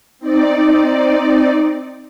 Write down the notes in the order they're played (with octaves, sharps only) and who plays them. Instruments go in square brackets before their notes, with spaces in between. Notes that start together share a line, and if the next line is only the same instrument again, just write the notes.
[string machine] C4 D#4 D5